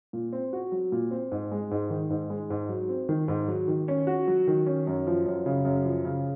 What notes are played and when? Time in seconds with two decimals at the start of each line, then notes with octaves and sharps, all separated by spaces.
0.13 A#2
0.33 C4
0.53 F#4
0.72 F#3
0.92 A#2
1.11 C4
1.31 G#2
1.52 G#3
1.71 G#2
1.90 D#3
2.10 G#2
2.30 G#3
2.50 G#2
2.69 F#3
2.89 C4
3.09 D#3
3.28 G#2
3.48 F#3
3.68 D#3
3.88 C#4
4.07 F#4
4.28 F#3
4.47 D#3
4.66 C#4
4.87 F#2
5.07 F3
5.26 F#2
5.46 C#3
5.65 F#2
5.85 F3
6.05 C#3